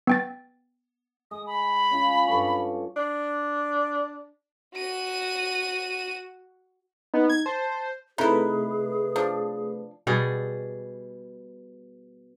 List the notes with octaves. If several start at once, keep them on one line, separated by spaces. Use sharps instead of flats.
B3 G5 A6
G#3 D#6
B5
C#4 F4
G2 A4 C#6
D4
F#4 D#7
B3 D#4
G#6
C5 A5
C3 A3 D#4 E4 G#4 B4
F3 D4
B2 G3 G#4